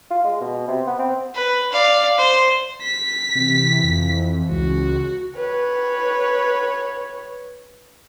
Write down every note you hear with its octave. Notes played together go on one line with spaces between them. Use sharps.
F4
G#3
B2
C3
B3
C4
B4
D5 F5
C5
B6
C3 E3
F2
C#2 F#4
B4 C#5